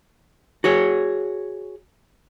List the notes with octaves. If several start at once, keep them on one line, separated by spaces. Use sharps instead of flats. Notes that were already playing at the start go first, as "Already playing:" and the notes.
F#4 G#4 C#5